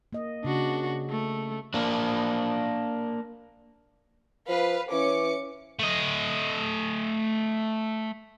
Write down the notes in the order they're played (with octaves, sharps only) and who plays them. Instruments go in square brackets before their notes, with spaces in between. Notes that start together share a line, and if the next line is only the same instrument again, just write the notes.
[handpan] A#3 D#5
[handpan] C#3 [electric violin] D4 F#4
[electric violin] A3
[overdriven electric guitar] A#3 D4
[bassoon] F3 [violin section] B4 F5
[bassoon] E3 [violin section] C#4 D6 C#7
[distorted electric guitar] A3 D#5